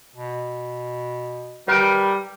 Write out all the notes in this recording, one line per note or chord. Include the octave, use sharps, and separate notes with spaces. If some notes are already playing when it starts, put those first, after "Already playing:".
B2
G3 A#4 B4 G5